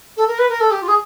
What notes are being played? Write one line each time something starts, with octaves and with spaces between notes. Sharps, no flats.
A4
A#4
B4
A#4
A4
G4
F4
G#4